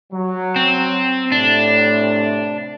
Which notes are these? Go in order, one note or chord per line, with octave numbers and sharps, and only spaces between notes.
F#3
C4
A2 C3 D4